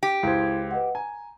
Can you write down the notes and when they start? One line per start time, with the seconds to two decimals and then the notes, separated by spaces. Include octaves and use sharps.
0.03 G4
0.23 C#2 E4 C5 G#6
0.71 B4 D#5 F#5
0.95 G#5 A#5